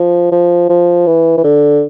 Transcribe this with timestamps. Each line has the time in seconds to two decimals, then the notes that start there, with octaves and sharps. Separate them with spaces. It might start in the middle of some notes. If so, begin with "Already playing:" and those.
Already playing: F3
0.32 F3
0.69 F3
1.06 E3
1.37 E3
1.44 D3